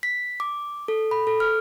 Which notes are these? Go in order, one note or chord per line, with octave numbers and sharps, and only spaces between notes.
B6
D6
A4
B5
A4
F6